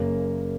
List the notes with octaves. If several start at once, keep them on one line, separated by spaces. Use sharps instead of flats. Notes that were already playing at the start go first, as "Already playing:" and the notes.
Already playing: F#1 F#2 C#3 A#3